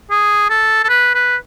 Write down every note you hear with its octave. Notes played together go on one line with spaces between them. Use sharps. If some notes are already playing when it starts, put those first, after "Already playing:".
G#4
A4
A4
B4
B4